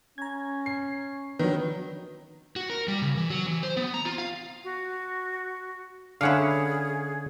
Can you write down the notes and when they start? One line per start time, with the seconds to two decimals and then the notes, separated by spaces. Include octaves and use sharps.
0.18 C#4 A#5 G#6
0.66 C7
1.39 D#3 F3 F#3 D4 B4
2.56 F#4
2.70 A#4
2.88 G3
3.02 C#3
3.17 E3
3.30 F#3
3.46 E3
3.63 C5
3.77 B3
3.94 A#5
4.05 F4
4.18 F5
4.64 F#4
6.21 D3 C#4 E4 G#4 F5 F#5